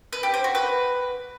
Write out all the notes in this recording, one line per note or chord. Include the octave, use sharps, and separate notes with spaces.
B4
G4
C5
F#4
B4